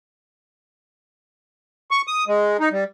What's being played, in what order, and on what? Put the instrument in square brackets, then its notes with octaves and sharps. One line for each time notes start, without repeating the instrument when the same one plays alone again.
[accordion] C#6
D#6
G#3
D#4
G3